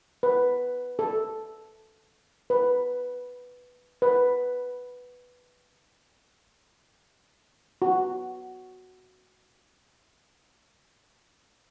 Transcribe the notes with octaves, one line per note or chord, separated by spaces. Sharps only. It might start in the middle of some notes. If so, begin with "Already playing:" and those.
B4
A4
B4
B4
F#4